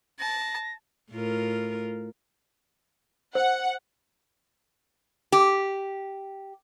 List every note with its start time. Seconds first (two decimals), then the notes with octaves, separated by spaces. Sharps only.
0.19 A5 A#6
1.12 A2 F4 A#4
3.35 C5 F#5
5.32 G4